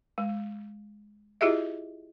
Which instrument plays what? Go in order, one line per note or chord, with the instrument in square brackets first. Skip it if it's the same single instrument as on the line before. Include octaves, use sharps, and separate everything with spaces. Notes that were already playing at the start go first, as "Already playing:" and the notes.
[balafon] G#3
E4 F4 G4 G#4 D#5 E5